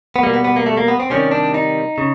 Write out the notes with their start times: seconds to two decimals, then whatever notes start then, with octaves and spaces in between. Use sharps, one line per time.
0.16 B3
0.23 B2 G3 A#3
0.34 B3
0.44 B3
0.56 A#3
0.66 A3
0.77 A#3
0.88 B3
1.00 C4
1.10 C3 D#3 G3 C#4
1.31 D4
1.54 D#4
1.98 C#3